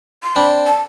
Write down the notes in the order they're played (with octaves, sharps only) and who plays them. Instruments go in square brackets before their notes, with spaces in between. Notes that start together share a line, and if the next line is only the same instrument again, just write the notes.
[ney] C6
[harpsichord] C4 D4 [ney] B5
[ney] A5